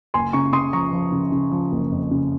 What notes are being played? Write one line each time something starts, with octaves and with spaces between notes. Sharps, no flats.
F#1 G#5 C6
C#3 A#5 C#6
C#3 C6 D#6
F3 A#5 C#6
F3
C#3
C#3
F3
F#1
F2
C#3